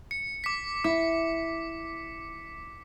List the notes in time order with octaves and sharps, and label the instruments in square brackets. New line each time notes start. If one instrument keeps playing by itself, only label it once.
[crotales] C#7
D6 B6
[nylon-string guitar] E4 [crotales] D6